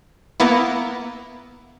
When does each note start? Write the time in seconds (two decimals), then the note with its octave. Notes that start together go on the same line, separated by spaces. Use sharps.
0.40 A#3 B3 E4